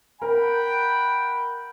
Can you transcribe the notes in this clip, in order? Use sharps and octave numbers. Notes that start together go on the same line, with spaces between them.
A#4 F#5 G5 B5